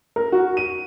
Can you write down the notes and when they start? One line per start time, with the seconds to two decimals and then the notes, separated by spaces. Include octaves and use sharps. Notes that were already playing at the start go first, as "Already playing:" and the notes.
0.16 A#4
0.32 F#4
0.57 D#7